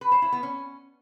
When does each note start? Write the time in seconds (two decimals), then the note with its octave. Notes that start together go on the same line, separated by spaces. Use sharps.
0.01 B4
0.12 C5
0.22 E4
0.32 B3
0.43 C#4